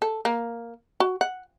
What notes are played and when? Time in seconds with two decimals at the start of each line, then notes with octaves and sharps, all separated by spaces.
0.02 A4
0.25 A#3
1.00 F#4
1.21 F#5